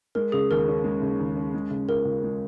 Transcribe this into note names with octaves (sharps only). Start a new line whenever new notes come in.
G#3 A#4
C#3 G#4
D#2 A#4
C#4
G#3
C#3
D#2
C#4
G#3
C#3
C#2 A#4
C#2
G#3